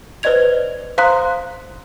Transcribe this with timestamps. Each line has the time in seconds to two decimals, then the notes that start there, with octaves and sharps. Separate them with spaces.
0.23 B4 C5 D5 D#5 G#6 F7
0.98 C5 F5 A#5 C6 D#6 F#6